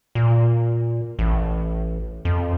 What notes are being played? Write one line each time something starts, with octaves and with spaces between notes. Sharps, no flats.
A#2
A1
F2